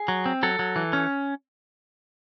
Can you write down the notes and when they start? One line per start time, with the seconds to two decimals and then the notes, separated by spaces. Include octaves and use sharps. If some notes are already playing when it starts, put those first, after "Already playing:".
Already playing: G#4
0.08 F#3
0.26 C4
0.43 F#3 A4
0.59 F#3
0.76 E3
0.93 C#4